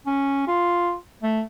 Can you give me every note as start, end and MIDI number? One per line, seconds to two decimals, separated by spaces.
0.06 0.43 61
0.47 0.94 65
1.22 1.41 57